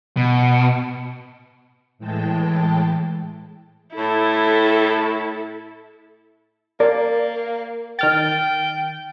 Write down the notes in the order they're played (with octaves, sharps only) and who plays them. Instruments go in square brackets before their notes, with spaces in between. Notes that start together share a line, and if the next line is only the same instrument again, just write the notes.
[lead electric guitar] B2
[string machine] A2 E3 G#3 G5 A5
[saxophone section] A2 [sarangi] E4 [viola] A4
[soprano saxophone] A#3 [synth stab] A#4 [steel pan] D5
[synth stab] D#3 F6 A6 [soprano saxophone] G5